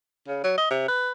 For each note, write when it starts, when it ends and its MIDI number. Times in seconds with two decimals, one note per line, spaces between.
0.28 0.42 49
0.44 0.53 54
0.58 0.67 75
0.71 0.88 48
0.88 1.12 71